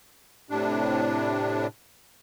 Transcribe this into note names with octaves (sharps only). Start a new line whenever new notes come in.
A2 C3 D4